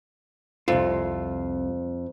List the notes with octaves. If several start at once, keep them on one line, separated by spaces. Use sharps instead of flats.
C2 F2 F4